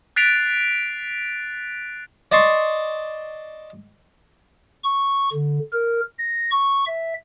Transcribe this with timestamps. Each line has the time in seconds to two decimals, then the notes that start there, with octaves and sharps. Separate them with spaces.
0.16 F#6 A6 B6 C7 D7 F7
2.32 D5 D#5 A5 C6 C#6
4.84 C#6
5.33 D3
5.72 A#4
6.18 A#6
6.51 C#6
6.86 E5